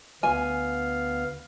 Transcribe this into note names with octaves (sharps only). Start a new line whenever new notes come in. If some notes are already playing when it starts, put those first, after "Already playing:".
D2 B3 F5 G#5